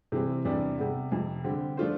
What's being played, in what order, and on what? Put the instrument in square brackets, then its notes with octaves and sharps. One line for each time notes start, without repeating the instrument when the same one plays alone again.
[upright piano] C3 E3 G3 C4
E2 C3 G3 D4
C3 G3 B3
F2 C3 F3
D3 G3 C4 G4
F3 A3 D4 F4 C5